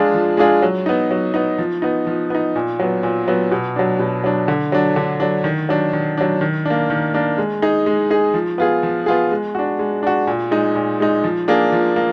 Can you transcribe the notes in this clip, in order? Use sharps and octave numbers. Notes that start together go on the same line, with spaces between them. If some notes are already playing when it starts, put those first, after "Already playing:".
Already playing: F3 G#3 D4 F4 G#4
F3
G#3 D4 F4 G#4
F#3
B3 D#4
F#3
B3 D#4
F3
B3 D#4
F3
B3 D#4
A#2
F#3 B3
A#2
F#3 B3
B2
F#3 D4
B2
F#3 D4
D3
F#3 D4
D3
F#3 D4
D#3
F#3 D4
D#3
F#3 D4
D#3
A#3 D4
D#3
A#3 D4
G#3
D#4 G#4
G#3
D#4 G#4
F3
B3 F4 G#4
F3
B3 F4 G#4
G#3
D4 F#4
G#3
D4 F#4
A#2
G#3 D#4
A#2
G#3 D#4
F3
A#3 D4 G#4
F3
A#3